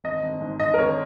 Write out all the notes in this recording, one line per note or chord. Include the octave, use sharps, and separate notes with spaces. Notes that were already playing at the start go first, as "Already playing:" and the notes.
G#1 D#5
G#1
G#2
G#2 D#5
A#4
G#1 C#5